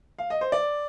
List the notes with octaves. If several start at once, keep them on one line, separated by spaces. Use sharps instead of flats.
F5
D#5
C5
D5